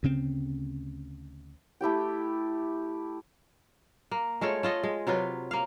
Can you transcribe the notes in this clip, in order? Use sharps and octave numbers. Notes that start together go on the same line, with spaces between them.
D2 C#3 C4
A3 E4 G4 G5
A#3
G#3 A3 F4 C#5
A3 F4 D#5
G#3
C3 F#3 F4 B4
A#3 F5